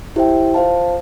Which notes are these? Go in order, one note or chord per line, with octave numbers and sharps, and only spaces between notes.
E4 G4 C5 E5 G5
F4 C5 F5 A5